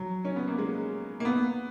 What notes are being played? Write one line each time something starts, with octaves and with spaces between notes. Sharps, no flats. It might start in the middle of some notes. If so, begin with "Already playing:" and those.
Already playing: F#3
C#4
B3
A#3
G#3
A#3
B3